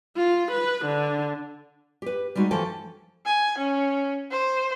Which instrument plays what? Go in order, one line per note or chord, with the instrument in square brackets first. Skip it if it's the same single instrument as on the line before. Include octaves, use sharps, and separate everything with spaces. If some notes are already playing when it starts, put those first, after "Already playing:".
[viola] F4
B4
D3
[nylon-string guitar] G4 B4
G3 G#3 D#4 F#4
E3 F3 A3 A4 C5 G5
[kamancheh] G#5
C#4
C5